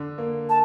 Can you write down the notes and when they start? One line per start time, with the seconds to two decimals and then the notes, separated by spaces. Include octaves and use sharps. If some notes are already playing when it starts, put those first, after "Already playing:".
Already playing: D3
0.18 A#3
0.49 A5